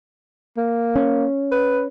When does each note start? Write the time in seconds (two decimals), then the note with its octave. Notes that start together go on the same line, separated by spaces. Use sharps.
0.57 A#3
0.96 C#4
1.51 B4